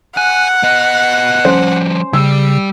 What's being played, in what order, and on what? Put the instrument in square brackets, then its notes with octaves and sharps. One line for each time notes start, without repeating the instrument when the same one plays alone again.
[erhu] F#5 [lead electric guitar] G#5 [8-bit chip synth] F#6
[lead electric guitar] B3 D#5
[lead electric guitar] F3 G3 [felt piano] C#4 C5
[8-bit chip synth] C#3 [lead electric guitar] G3 G4 [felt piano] E6